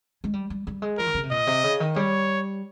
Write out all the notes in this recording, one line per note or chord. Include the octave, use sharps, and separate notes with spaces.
G#3
G3
G3
G3
G#3
F3 A#4
D#3
C#3
C3
A#2 D#5
C3
C#3
D#3
G3 C#5